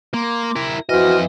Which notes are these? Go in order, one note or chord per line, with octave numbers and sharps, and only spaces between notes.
A#3 C6 D6
E4 A#4
F2 E3 F#4 C5 D#5 F6